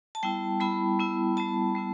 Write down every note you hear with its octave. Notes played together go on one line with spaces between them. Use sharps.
A5
G3 B3 E4 G5
G3 B3 E4 B5
G3 B3 E4
G3 B3 E4 A5
G3 B3 E4